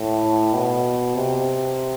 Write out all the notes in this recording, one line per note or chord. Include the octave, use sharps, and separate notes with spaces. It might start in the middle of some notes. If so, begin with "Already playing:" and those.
Already playing: A2
B2
C3